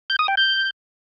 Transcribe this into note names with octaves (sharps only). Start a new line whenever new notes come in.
G6
D#6
G5
G6